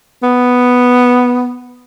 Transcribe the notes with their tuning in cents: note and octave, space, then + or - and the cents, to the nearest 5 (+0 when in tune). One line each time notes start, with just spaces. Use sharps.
B3 +0